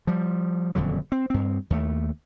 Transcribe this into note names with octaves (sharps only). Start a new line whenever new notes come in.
F3 G3
D#1 F2 D3 F#3
C4
G2 C4
D#2 A3